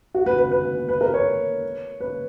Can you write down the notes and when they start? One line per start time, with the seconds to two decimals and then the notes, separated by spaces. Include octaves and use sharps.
0.14 F#4
0.26 B4
0.39 B4
0.51 B4
0.89 B4
1.01 A#4
1.14 C#5
2.00 B4